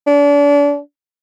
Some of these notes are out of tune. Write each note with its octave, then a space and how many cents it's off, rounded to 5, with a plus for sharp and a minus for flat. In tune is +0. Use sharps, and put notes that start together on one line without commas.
D4 -35